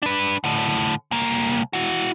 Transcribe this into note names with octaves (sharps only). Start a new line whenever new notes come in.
D4 B4
A2 D3
C2 A#3
E4 F#4